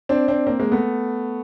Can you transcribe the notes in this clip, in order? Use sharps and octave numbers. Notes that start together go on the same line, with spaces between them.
C4 D4
C4 D4
A#3 C4
G#3 A#3
A3 B3